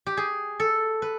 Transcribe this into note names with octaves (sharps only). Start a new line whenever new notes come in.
G4
G#4
A4
B4